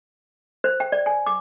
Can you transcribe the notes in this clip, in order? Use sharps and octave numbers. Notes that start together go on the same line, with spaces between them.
C5
G5
D5
G#5
D6